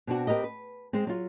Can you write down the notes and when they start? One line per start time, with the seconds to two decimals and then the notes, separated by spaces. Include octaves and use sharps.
0.07 B2 C4 D4 F#4
0.27 C4 G4 A#4 B4 D#5
0.44 B4
0.93 G#3 C4
1.07 F#3 F4